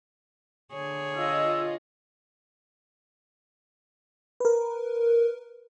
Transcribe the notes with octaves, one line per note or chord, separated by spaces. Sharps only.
D3 G#4 C#5
F4 D#5 E6
A#4 B4